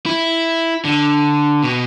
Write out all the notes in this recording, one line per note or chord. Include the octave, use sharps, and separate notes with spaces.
E4
D3
B2